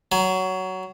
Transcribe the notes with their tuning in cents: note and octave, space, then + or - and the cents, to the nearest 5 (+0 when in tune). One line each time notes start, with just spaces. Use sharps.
F#3 +15